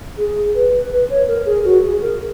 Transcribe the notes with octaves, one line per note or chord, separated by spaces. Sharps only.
G#4
B4
B4
C#5
A#4
G#4
F#4
G#4
A#4